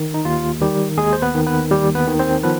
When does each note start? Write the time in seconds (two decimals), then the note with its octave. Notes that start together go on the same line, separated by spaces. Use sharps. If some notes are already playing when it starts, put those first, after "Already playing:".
Already playing: D#3
0.14 D#4
0.25 D#2 F4
0.61 D#3 G3 G4
0.98 D#2 G#3 G#4
1.13 C5
1.22 B3 B4
1.35 D#3
1.46 B3 B4
1.71 D#2 G3 G4
1.95 B3 B4
2.07 D#3
2.19 C4 C5
2.43 F3 B3 B4